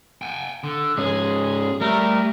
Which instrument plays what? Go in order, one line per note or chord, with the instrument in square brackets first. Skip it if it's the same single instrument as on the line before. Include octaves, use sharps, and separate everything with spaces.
[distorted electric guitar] G5 G#5
D3
[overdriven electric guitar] G#2 C#4 [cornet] G#3 [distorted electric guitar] G#4
[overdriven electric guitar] G3 [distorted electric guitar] A3 [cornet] A#4